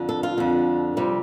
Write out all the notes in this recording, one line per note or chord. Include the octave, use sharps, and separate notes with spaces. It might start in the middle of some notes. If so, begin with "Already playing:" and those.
Already playing: F2 D3
A4
F4
F2 D3
F2 C3 G3